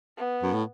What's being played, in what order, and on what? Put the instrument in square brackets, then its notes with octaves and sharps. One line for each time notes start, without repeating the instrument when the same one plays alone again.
[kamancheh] B3
[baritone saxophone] F#2
A2